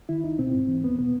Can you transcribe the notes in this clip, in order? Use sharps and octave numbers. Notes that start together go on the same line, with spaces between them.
D#3 E4
C#2 D#4
B2 C4
G#2
E3
E2 B3
B2 B3